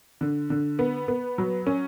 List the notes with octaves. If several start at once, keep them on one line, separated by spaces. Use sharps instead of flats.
D3
D3
B3
B3
F#3
C#4